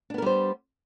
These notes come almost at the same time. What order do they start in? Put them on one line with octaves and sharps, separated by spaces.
D4 B3 A#4 G3 C5